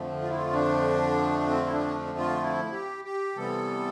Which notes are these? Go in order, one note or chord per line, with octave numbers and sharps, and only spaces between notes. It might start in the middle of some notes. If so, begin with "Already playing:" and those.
Already playing: F2 D3 F3 A3
F4
E4
F4
D4
C4
E4
D4
F4
E4
G4
G4
C3 E3 G3 B3 A4